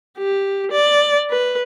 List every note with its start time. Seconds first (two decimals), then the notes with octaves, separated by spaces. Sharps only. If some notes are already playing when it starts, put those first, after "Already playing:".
0.18 G4
0.72 D5
1.30 B4